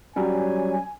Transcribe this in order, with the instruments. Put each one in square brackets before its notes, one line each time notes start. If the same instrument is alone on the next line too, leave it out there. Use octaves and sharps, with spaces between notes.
[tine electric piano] F#3 G3 C#4 [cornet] G#5